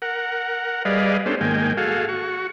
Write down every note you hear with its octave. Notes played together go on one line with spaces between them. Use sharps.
A#4 F#5
G3 G#4 B4 D5 D#5 F5
B3 C#4 D4 G4 A4 C5
G#2 D#3 A#3 G5 G#5
F#4 G#4 A4 F5
F#4 C#6